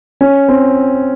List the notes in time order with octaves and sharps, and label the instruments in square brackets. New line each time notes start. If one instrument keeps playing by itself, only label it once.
[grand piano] C#4
C4